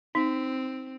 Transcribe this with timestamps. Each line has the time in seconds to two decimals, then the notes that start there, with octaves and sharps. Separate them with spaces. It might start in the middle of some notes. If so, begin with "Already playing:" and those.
0.15 C4 D#4